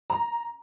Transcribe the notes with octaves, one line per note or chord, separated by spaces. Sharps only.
A#5